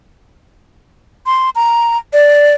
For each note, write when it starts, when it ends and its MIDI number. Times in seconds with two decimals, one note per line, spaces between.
1.26 1.50 84
1.56 1.98 82
2.13 2.55 74